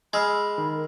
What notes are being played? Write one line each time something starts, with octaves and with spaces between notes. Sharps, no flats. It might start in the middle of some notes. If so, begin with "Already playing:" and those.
G#3 G#4 B5 E6 F6
D#3
A#4